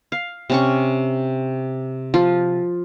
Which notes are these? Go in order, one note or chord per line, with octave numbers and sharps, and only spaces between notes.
F5
C3 C#4 C#6
F3 F4